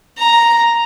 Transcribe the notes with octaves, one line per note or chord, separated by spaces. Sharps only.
A#5